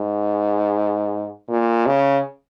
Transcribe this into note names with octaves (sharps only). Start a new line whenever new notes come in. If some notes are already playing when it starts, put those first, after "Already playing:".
Already playing: G#2
A#2
C#3